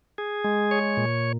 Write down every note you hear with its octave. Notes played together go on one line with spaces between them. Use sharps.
G#4
G#3
C#5
A#2